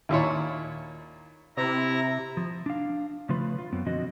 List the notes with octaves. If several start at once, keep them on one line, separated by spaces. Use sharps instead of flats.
D#2 A#2 E4 C#5
C3 E4 A#5
F3
D4 F5
C#3 F3 A3 F4 B4
F4
F#2 B3 C4
B2 D3 F3 C4 F#4 D#5